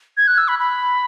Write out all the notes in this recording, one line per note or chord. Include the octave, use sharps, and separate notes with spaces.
G#6
F#6
E6
B5
B5